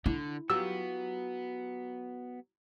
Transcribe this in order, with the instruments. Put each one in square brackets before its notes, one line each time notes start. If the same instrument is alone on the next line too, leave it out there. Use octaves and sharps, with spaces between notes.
[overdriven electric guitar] D3 [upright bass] E4
[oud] F#3 F4 G4 [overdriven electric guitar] B3 [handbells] E6